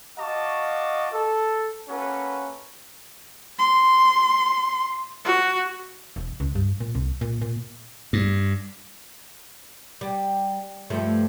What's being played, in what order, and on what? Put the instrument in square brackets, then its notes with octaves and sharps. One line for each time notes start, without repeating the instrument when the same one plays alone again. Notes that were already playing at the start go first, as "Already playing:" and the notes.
[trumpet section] F#4 D#5 F5 A5 C#6 D6
A4
A#3 C#4 F#4 A4 B4
[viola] C6
F#4
[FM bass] E1
C#2
G2
A#2
C2
A#2
A#2
[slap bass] G2
[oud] G3
G2 F3 A3